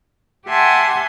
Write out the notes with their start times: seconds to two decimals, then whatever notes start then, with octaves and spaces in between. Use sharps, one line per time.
0.48 G4 E5 F#5 G#5 A5 C6